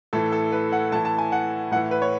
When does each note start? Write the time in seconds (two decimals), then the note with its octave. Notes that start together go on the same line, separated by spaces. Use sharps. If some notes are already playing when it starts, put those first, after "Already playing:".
0.13 A2 E3 A4
0.32 A4
0.52 B4
0.72 F#5
0.92 A2 E3 A5
1.05 A5
1.18 G#5
1.32 F#5
1.71 A2 F#5
1.76 E3
1.91 B4
2.02 C#5